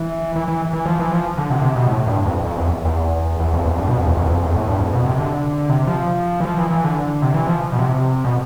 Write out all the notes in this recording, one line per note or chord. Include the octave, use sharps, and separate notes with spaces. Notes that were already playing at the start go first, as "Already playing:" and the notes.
Already playing: E3
E3
E3
E3
F3
E3
F3
D3
C3
D3
C3
B2
A2
G2
F2
F2
E2
E2
E2
F2
E2
G2
B2
F2
E2
F2
E2
F2
E2
A2
G2
F2
B2
C3
D3
C3
F3
E3
F3
E3
E3
D3
C3
E3
F3
B2
C3
B2